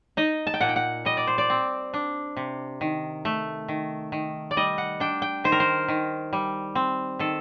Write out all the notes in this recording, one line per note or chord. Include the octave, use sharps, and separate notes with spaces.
D#4 D#5
A5
G5
A#2 F#5
G5
F#5
G3 D#5
D5
C5
D5
C4
D4
C3
D#3
A3
D#3
D#3
D5
G3 D#5
F#5
D4 G5
G5
D#3 C5
A#4
C5
D#3
G3
C4
D#3 A4